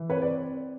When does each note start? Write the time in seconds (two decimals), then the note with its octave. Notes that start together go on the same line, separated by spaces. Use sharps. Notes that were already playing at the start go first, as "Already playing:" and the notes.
Already playing: E3
0.09 C4 B4 C#5
0.22 D5